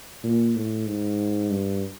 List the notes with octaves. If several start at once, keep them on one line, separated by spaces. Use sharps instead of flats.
A#2
A2
G#2
G2